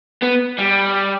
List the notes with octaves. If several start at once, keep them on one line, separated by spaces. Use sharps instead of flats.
B3
G3